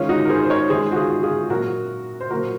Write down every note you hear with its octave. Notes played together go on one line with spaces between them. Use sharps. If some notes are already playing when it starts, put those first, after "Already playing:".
Already playing: D#3 G#3 C#4 F4
D#4 F#4
A#4
G#4 C5
C5
A#4 C#5
D#3 G#3 G#4 C5
F#4
F4 G#4
F4 G#4
A#2 F#3 A#3 F#4 A#4
C5
A#2 F#3 A#3 F#4 A#4